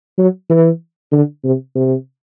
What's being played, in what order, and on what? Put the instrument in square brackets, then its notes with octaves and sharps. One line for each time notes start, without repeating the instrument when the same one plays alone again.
[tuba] F#3
E3
D3
C3
C3